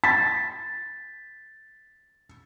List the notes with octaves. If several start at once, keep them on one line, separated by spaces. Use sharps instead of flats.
A6 B6